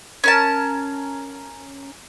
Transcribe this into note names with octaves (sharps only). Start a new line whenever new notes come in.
C#4 A#4 A5